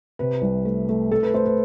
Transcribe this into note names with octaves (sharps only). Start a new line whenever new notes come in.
C3 B4
C2
A3
A3
A3 A4
B4
A3 C5
B4